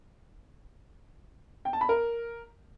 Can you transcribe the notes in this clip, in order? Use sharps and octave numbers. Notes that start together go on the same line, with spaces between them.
G5
A5
B5
A#4